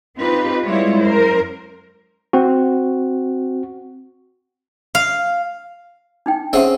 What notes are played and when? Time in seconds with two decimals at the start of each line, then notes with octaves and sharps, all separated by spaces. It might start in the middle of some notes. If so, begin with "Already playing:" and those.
0.17 C4 D#4 F4 G4 B4
0.65 G3 G#3 E4 F4 C#5
1.00 F#2 A#4 C5
2.33 C4 F#4
4.95 F5
6.26 D4 D#4 G5
6.53 C4 C#4 G#4 E5 F#5 C6